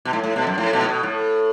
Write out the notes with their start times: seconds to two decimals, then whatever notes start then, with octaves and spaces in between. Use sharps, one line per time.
0.05 B2
0.13 A2
0.24 A2
0.36 B2
0.47 F#2
0.58 A2
0.73 B2
0.81 A2
0.89 B2
1.03 A2